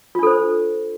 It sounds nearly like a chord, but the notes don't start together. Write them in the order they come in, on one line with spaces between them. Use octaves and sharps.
F4 D4 A4 C5